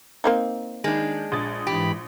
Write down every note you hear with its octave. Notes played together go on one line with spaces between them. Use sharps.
A#3 C4 D#4
D#3 G#3 D4
A#1 D#6 A6
G#2 E3 G4 B5